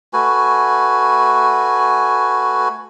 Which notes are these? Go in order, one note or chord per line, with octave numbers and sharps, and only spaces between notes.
A3 F#4 B4 G#5